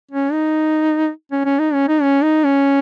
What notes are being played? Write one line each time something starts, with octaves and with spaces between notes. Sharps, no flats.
C#4
D#4
C#4
C#4
D#4
C#4
D#4
C#4
D#4
C#4